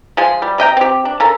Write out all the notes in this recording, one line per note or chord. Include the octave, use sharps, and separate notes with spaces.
F3 G#3 G#4
G3
C3 D#5 G5 A#5
C4 G4
D4
C#3 A4 A#4